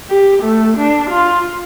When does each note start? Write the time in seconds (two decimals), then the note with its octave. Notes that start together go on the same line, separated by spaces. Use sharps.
0.10 G4
0.43 A3
0.77 D4
1.10 F4